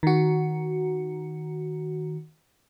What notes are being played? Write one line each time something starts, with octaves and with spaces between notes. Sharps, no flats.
D#3 F#4